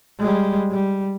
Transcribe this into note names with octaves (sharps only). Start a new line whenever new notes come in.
G3 G#3
G3